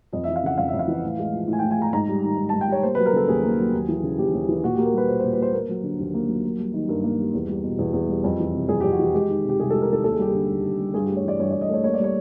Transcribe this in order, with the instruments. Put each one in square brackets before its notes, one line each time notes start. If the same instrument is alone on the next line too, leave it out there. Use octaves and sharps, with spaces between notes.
[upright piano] F2 D#5
E5
E3
F5
C#3 F#5
F2 F5
E5
F2
F5
E3
A2
G#3
F3
A2
G#5
G5
A2
G#5
G#3 A#5
G#2 A#5
G3
D#3
G#2
A5
G#2
G5
G3 C#5
A#3 C5
B4
F#3
A#4
C#3 A4
D#2 G#4
A#3
F#3
D#2
E3
C#3
D#2 G4
D#2
E3
A#2 F#4
G4
A#3
A#4
G3 B4
A#2 C5
C5
A#2
B4
A#3 C5
A#3 A#4
F#3
D3
D#2
A#3
F#3
A#3
G3
D#3
G2 A#4
A#3
G3
E2
G3
B2
E2
E2
G3
F2
E3
C3
F2 G#4
G4
F2
F#4
E3 G4
G#3 G4
D#3
C3 G4
C2 G#4
A4
G#3
A#4
D#3 A4
D#2 A4
G#4
G3 G4
G#4
D3
D#2
D#2
G3
G2 G#4
G4
A3
C#5
E3 D5
G2 C#5
D5
G2
D#5
A3 C#5
A#3 C#5
D5
G3 C#5